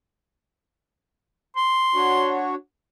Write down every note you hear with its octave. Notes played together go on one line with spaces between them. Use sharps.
C6
D4 F#4 C#5